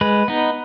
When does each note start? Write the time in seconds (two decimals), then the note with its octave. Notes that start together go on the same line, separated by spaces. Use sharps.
0.01 G#3 B4
0.28 B3 D#4